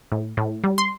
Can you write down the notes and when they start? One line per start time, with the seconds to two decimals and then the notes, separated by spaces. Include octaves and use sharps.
0.12 A2
0.37 A2
0.64 G3
0.78 C6